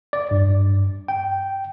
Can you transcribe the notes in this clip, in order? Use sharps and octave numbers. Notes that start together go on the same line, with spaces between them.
D5
G2
G5